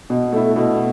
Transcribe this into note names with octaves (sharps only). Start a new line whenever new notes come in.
B2
A3 E4
B2